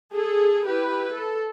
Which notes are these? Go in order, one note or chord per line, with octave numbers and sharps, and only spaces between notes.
G#4 A4
E4 G4 B4
A4